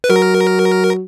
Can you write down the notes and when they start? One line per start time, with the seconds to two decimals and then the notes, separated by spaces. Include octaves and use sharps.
0.04 B4
0.09 F#3 A#4